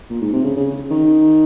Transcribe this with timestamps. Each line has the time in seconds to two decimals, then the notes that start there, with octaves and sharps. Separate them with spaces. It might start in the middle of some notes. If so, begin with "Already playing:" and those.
0.10 A#2
0.21 G#2
0.33 C3
0.44 C#3
0.56 C#3
0.91 D#3